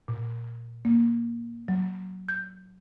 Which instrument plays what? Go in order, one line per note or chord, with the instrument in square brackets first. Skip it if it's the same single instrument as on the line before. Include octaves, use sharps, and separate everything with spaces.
[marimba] A#2
A#3
F#3
G6